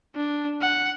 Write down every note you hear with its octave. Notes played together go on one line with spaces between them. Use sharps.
D4
F#5